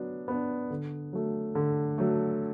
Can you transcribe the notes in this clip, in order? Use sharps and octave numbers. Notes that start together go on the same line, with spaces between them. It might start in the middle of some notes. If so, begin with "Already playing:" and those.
Already playing: F#3 B3 D4
B3 D4
D3
F#3 A3
D3
F#3 A3